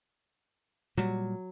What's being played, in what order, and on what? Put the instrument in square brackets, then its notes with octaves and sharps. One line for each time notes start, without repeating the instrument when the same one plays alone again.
[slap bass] A#2 G3 [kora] F#3